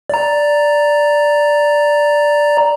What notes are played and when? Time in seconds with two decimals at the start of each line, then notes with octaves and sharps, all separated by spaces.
0.10 D5 A#5